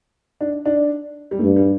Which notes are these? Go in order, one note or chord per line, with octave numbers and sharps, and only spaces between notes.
D4
D4
G3
G2 A3
G3